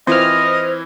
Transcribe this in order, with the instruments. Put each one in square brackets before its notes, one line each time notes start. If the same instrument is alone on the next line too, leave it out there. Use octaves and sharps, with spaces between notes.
[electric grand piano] E3 E4 [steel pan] C4 F4 A#4 [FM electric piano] C5 F6 [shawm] D#5